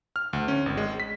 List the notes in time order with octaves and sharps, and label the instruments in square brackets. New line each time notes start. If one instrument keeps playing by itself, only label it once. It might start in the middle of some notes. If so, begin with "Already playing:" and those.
[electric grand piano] F6
D2
C#4
G#1
G#3
B6